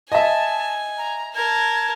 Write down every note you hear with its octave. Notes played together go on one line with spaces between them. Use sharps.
D#5 E5 G#5 A5
A#5
A#4 A5 G#6